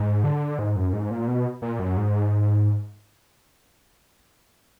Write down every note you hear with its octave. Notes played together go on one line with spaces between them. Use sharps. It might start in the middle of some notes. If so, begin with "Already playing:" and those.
Already playing: G#2
D3
G#2
F#2
G#2
A#2
B2
A#2
F#2
G#2